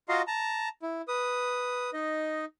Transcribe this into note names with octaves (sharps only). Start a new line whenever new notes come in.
F4 F#4 D#5 F5 A#5 C6
A5 A#5
E4
B4 D#6
D#4 D#5